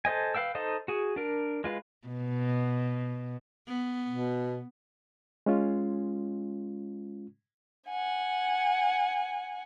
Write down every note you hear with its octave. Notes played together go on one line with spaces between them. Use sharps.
A4 C5 D#5 G#5
B4 F5 G5 E6
D#4 A4 C5 D#5
F#4 G#4
D4 A#4
G#3 F4 B4
B2
B3
B2
G#3 C#4 F4
F#5 G#5